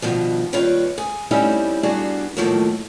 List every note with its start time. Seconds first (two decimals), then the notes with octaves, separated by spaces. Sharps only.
0.02 G2 B2 D#3 F3
0.53 D#2 G3 F4 B4 C#5 G5
0.98 G#4
1.31 G3 A3 C4 C#4 D#4 E4
1.83 G3 B3 D4 F#4 G#4 F5
2.37 A2 D#3 F3 F#3 A3 A#3